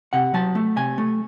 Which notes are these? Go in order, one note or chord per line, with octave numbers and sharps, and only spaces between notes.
C3 F#5
F#3 A5
A3
C3 G#5
A3